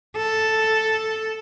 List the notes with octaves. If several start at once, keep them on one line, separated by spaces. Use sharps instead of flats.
A4